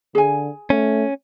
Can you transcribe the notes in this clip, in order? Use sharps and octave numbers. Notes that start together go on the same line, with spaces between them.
D3 G#4 G#5
A3 C#4